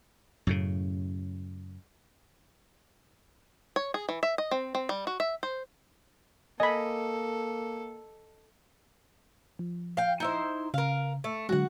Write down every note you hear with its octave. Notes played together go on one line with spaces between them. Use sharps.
F#2 A2 C#3
C#5
G#4
E3
E5
D#5
C4
C4
G3
F#4
E5
C5
A#3 A4 D#5 G#5 B5
F3
F5 G5
D#4 E4 C5
C#3 A#4 F5
A3
D3 F#3 G#3 F#4 F#5